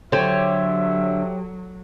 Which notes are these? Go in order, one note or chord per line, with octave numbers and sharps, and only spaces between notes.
D3 F#3 G4 C5 C#5 E5